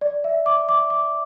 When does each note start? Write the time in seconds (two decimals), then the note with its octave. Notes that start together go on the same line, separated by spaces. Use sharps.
0.01 D5
0.24 E5
0.46 D6
0.69 D6
0.90 D6